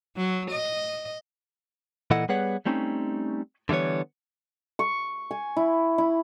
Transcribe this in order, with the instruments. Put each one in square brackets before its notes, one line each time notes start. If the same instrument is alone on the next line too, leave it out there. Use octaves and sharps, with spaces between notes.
[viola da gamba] F#3
D#5
[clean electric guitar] A#2 E3 E4 A4 D#5 F#5
G3 B3 G#4 B4 C#5 F#5
G3 A3 C4 C#4 D#4
D3 E3 G3 B3 C#5
[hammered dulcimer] C#6
G#5
E4
E4